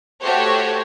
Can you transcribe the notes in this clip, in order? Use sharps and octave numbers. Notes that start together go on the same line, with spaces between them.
A3 F#4 G4 C5 C#5